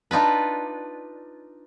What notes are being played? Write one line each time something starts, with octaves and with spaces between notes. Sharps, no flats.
D4 D#4 F4 B4